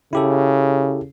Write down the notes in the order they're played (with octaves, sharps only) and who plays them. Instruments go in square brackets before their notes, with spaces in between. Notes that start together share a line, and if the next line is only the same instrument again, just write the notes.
[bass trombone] C#3 [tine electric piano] E4 G4 A4